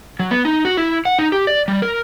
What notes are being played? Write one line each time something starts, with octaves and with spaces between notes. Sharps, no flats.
F#3
B3
D#4
F#4
E4
F#5
D#4
G4
D5
G3
A#4